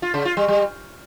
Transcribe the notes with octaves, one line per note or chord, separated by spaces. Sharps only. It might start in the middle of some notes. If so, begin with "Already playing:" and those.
F4
C#3
F4
G3
G3